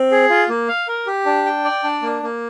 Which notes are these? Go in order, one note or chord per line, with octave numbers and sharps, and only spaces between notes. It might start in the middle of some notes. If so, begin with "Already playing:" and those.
Already playing: C4
G#4
F4
A#3
F5
A#4
G4
D4
G5
D5
D4
A#3
A#3